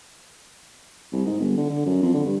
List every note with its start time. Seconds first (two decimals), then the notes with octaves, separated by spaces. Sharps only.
1.12 C2
1.26 G#2
1.40 G1
1.57 D3
1.69 D3
1.85 F#2
2.02 F2
2.14 D3
2.25 G2